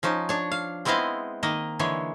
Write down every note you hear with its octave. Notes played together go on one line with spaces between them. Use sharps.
F3 C#4 D#4
D4 C#5
F5
G#3 B3 C4 E4 D#5 F5
D#3 A#3 D#5
D3 E3 G#3 C#5